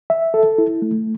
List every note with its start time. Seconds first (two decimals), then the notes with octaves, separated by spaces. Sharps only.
0.10 E5
0.34 A4
0.58 E4
0.82 A3